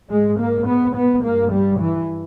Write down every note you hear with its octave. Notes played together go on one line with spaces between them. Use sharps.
G#2 G#3
A#3
B3
B3
G2 A#3
G3
E3